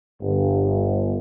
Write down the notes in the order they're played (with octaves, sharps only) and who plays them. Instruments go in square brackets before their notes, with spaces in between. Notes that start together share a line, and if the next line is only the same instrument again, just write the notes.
[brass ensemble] G1